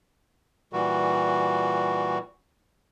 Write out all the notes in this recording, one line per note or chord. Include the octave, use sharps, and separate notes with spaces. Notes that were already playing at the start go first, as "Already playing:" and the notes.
A#2 E3 G3 F#4